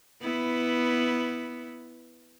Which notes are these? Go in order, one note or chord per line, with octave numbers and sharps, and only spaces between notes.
B3 E4